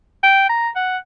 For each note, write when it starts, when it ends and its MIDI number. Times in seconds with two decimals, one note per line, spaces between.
0.23 0.46 79
0.49 0.69 82
0.76 0.98 78